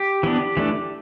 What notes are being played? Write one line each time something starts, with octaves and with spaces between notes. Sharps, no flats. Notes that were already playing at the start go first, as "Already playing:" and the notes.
Already playing: G4
E3 B3 D4
E3 A3 D4